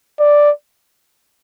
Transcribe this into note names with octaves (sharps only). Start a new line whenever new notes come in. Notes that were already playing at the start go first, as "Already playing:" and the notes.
D5